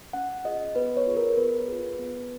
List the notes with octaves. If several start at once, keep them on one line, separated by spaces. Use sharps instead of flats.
C#4 F#5
F4 G#4 D#5
B3 B4
C#5
F4 G#4
A#4
B3 B4
F4 G#4
B3